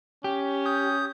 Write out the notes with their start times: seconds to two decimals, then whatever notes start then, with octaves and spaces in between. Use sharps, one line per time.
0.24 C#4 G4
0.66 D#6 G6